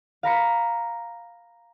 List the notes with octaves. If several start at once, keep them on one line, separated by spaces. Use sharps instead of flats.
F5 A#5 B5 C#7